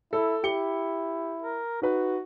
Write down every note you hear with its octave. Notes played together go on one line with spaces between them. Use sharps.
E4 A4
E4 G4 C#7 G7
A#4
D#4 F#4 B4